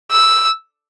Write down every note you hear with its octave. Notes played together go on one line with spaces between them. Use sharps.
E6